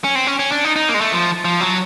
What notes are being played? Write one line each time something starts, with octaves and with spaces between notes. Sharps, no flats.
C#4
C4
C#4
C#4
D4
D#4
D#4
A#3
G#3
A3
F3
F3
F#3